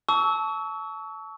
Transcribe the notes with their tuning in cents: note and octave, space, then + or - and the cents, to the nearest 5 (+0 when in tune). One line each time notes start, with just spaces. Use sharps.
A5 -10 C#6 +30 E6 -25